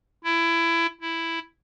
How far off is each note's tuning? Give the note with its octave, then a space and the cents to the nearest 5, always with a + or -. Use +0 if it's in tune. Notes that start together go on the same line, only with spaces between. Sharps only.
E4 +20
E4 +5